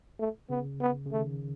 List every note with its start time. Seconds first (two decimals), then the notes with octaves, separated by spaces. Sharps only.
0.19 A3
0.50 C#3 B3
0.81 B3
1.06 C#3
1.12 D#3 A3